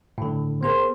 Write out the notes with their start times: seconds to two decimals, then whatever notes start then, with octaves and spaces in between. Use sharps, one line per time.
0.18 A2 D3
0.63 B3 G#4 A#4 C5